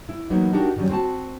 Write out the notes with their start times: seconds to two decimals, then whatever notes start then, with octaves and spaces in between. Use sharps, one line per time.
0.09 E4
0.30 E3 F#3 A#3 B3 D#4
0.53 D4 D#4 F#4 G4 A#4
0.76 D#3 F#3 G3 C#4
0.89 C4 F#4 G#5 A5